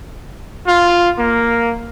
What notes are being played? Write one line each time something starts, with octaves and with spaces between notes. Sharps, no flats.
F4
A#3